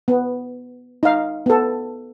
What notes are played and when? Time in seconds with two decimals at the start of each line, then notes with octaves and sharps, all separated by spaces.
0.08 B3
1.03 D#4 F5
1.46 B3 A4